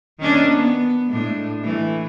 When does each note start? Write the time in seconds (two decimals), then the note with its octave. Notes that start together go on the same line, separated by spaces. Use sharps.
0.19 D#3 C#4 D4
0.52 B3
1.10 A2 G#3 D4
1.63 E3 A3